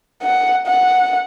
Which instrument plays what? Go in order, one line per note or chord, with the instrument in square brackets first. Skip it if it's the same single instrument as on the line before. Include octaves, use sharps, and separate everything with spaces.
[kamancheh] F#5
F#5